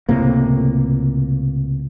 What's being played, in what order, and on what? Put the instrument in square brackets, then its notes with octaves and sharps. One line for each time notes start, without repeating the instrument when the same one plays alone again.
[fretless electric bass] C#2 A2 C3 A#3